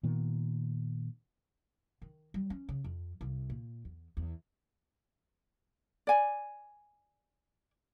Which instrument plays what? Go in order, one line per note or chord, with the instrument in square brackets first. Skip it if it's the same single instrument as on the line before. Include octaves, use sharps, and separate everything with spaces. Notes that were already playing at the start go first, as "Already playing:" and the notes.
[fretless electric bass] A#2 D#3 B3
[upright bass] D#3
G3
C#4
C#3
F2
C2
A#2
E2
E2
[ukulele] D5 G#5